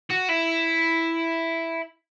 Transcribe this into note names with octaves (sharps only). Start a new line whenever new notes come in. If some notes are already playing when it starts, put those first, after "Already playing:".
F#4
E4